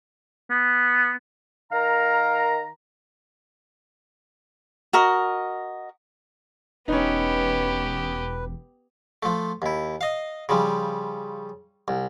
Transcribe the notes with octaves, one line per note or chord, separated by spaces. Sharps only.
B3
D#3 A#4 F5 A#5
F#4 A#4 D#5
E1 B3 C#4 D#4 G4 B4
F3 A3
D#2 E4
D#5 F5
C#3 F3 G3
C2